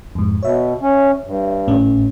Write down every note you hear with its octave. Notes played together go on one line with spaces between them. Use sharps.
F2 G#2
B2 C#5 E5
C#4
G2
G#1 A2 C#4